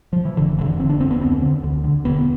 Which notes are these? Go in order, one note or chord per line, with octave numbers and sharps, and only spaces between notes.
F3
E3
F1 D3
F2 D3 E3
F1 C4
D4
F2 D3 C4
B3
D2 C4
D3
D2
D3
E1 B3